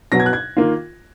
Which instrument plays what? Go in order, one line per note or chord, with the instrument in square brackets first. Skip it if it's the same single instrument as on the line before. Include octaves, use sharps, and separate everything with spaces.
[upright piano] B2 F#3 B3 A#6
G#6
F#6
G#6
D#3 A#3 F4